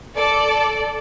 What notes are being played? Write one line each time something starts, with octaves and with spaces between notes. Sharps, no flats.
A4 D5